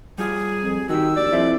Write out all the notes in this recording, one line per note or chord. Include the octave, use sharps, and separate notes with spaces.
G3 F4 G#4
F2
D#3 F#4 G4 E6
A#1 D5
F2 E4 C5 E5